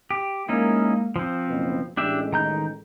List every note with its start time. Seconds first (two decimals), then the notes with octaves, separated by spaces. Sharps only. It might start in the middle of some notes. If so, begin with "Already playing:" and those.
0.11 G4
0.49 G#3 A#3 C#4 D#4 E4
1.16 F3 C4
1.48 F#1 B2 B3
1.97 A1 G#3 D4 G4 E5
2.32 D#3 A#5 G6